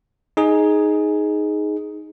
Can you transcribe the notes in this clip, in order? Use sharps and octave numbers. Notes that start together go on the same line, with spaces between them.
D#4 G#4